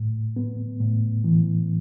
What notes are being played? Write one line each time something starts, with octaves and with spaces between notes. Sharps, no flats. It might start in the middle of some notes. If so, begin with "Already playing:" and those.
Already playing: A2
B3
A2
E3